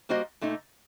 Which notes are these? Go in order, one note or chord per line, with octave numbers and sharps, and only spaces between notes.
G3 A#3 F#4 C5 D#5
A#2 A3 D#4